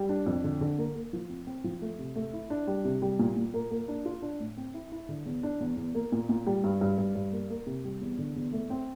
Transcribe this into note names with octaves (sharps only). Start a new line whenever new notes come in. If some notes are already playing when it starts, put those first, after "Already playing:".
Already playing: G3
D4
F2
D3
D3
A#3
A#3
F3
C4
C4
F3
A3
C3
A3
E4
D4
G3
C3
G3
A#2
A#2
A#3
A#3
D4
F4
D4
A2
C4
E4
E4
D3
E2
D4
E2
E2
A#3
A#2
A#2
G3
G2
G2
G2
G2
A#3
A#3
C3
G3
E2
D3
E2
A3
C4